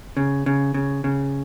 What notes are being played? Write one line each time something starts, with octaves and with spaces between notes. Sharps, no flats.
C#3
C#3
C#3
C#3